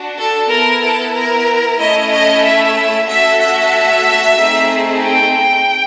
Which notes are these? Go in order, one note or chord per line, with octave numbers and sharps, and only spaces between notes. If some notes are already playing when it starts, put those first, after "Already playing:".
Already playing: D4 F#4
A4
B3 E4 A4 A#4
A4
A#4
A3 C#4 E4 D#5
D#5
E5
A3 C#4 F#4 A4 E5
E5
A3 C4 D#4 G#4
G5